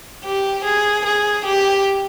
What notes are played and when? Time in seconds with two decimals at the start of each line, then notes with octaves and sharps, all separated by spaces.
0.25 G4
0.65 G#4
1.05 G#4
1.46 G4